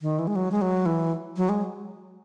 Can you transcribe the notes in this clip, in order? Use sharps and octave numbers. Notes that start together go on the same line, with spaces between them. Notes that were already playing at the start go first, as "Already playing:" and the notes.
D#3
E3
G#3
F#3
G#3
F#3
E3
F#3
G#3